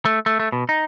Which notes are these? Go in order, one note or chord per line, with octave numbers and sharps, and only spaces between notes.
A3
A3
A3
B2
D#4